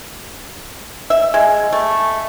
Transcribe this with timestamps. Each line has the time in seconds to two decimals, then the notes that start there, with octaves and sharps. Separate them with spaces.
1.10 E5
1.34 G#3
1.73 A3